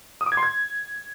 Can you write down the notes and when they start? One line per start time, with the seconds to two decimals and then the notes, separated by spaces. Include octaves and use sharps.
0.21 D#6
0.26 D6
0.32 G#6
0.37 C6
0.43 G#6